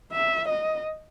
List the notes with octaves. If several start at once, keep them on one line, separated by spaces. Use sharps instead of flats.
E5
D#5